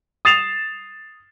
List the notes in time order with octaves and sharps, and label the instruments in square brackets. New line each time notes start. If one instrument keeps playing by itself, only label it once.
[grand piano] D#6 A6 C7 E7 F7